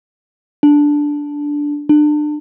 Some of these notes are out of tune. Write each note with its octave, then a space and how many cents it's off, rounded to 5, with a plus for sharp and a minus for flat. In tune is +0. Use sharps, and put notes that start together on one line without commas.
D4 -5
D4 +30